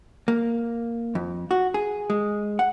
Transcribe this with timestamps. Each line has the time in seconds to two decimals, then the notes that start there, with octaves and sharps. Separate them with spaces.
0.28 A#3
1.15 F2
1.51 F#4
1.74 G#4
2.10 G#3
2.59 F#5